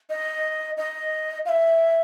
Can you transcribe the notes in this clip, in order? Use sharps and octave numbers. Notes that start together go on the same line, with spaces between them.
D#5
D#5
F5
E5